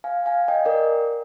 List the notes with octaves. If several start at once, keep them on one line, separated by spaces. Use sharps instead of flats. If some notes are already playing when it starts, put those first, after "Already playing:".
F5 G#5
F5 G#5
D#5 G5
A#4 D5